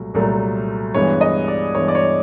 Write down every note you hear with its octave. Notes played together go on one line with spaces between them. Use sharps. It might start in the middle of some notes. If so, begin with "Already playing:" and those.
Already playing: C2 A#2 F#3 A3
C2 A#2 F#3 A3
G2 E3 G#3 B3 C#5
D#5
D5
G2 E3 G#3 B3 C#5
D5
C#5